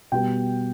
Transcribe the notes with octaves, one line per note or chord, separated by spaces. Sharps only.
B2 G3 B3 G5